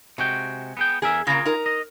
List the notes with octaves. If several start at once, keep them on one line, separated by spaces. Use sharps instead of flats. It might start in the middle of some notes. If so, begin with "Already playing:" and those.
C3 G#3 F#4 G5
B3 G#4 G5
E2 G#4 A#4 E5
C#3 A#3 F4 G#4 A#5
D#4 A#4
D#5